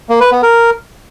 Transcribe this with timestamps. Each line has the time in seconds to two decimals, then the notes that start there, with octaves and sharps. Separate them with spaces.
0.09 A#3
0.20 B4
0.32 B3
0.43 A#4